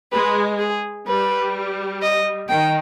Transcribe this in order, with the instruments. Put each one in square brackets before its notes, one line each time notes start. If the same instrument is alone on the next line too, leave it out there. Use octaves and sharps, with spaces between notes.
[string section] G#3 [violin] B4
[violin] G#4
[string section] G3 [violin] B4
[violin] D#5
[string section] D#3 [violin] G5